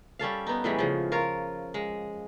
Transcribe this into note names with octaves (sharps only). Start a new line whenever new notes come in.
G3 C#4 A4 F5
B3 D#4
A2 E3 G3 G#3
C#3 F3
F4 A#4 C#5
G#3